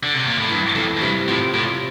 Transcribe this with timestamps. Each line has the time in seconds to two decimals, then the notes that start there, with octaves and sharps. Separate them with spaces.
0.03 D3
0.15 C3
0.27 A#2
0.39 A2
0.50 G2 E3
0.75 F2 A3 E4 A4
0.97 F2
1.01 G2 C3
1.28 A2 F3 C4
1.53 A2 C3